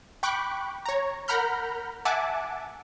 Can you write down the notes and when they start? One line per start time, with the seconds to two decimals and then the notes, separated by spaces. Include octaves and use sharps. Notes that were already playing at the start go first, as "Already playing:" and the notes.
0.23 G5 B5 C#6 D6 F#6
0.86 C#5 A#5
1.28 A#4 F#5 A#5 B5 F6 G6
2.05 E5 F#5 G#5 A5 D6